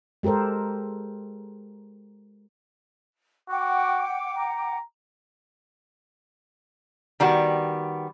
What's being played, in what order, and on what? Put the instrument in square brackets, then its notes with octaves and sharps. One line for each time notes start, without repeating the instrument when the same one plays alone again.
[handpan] G#3 G4 A4 A#4 C5
[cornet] F#4 [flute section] F#5 G5 D6
[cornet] A#5
[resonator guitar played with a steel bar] D#3 G3 B3 F#4